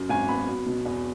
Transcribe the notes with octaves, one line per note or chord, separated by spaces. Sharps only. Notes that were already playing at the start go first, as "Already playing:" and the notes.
Already playing: F#2 F#3
G#1 G#5
B3 B5
F#3
B2
E2